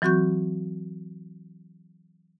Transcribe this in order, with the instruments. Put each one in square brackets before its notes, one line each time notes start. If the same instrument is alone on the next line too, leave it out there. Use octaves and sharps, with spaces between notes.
[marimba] E3 F#3 C4 F#4 C#6 G6